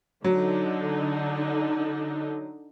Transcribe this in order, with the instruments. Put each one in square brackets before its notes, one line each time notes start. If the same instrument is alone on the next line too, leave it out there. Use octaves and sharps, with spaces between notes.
[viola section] D3 D#4 [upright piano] F#3